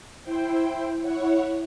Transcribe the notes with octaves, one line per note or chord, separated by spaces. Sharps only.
E4 C5 G5
E4 C#5 F#5